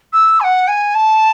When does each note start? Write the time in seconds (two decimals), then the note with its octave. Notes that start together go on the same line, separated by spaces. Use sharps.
0.13 E6
0.40 G#5
0.44 F#5
0.68 G#5
0.95 A5